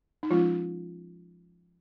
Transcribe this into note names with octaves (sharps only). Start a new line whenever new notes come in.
D#4
F3 G#3 C#4 F4